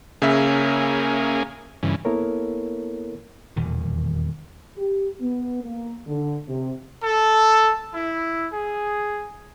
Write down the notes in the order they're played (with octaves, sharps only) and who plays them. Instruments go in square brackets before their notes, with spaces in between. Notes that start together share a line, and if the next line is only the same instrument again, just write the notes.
[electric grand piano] C#3 E5 [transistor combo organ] A#3 C#4 G#4
[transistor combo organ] G2 C#3 E3
[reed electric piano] A#3 B3 E4 A4 A#4 C#5
[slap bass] D#1 E2 B2 D#3
[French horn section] G4
B3
A#3
D3
C3
[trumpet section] A4
E4
G#4